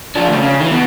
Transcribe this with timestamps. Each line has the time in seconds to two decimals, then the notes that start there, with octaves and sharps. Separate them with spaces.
0.16 F3 D4
0.29 D2 C#3
0.43 C#3
0.60 D#3 E3
0.72 B2